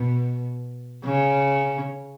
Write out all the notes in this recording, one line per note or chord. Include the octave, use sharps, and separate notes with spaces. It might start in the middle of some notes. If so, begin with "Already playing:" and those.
Already playing: B2
C#3